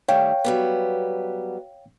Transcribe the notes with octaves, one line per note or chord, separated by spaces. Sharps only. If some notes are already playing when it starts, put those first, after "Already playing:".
D#3 G3 A3 C#5 F5 G5
F#3 G3 B3